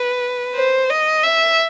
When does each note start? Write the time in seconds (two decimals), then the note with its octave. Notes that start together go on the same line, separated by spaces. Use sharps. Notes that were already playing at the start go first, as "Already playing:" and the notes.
Already playing: B4
0.55 C5
0.89 D#5
1.23 E5